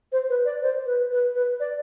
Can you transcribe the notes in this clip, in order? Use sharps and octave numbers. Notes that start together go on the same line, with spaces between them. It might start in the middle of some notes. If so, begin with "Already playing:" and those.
C5
B4
D5
C5
B4
B4
B4
D5